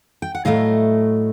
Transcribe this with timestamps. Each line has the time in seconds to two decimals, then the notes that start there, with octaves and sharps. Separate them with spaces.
0.22 G5
0.35 F#5
0.45 A2 F#3 A3 D#5 F5